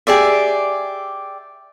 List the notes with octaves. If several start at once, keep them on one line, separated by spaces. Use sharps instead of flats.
G4 G#4 D5 E5